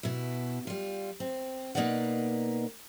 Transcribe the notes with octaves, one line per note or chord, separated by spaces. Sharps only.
B2 E4
G3 F4
C4
B2 A#3 D#4 B4 D5 F#5